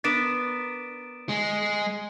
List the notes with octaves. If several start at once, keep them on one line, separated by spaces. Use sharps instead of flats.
B3 D4 A#4 A6 D7 E7
G#3